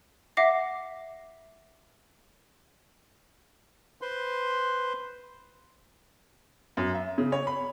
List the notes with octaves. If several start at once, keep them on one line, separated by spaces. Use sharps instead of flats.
E5 F#5 D6 A#6 C7
B4 C5 C6
F#2
E5
C#3
C#5
B5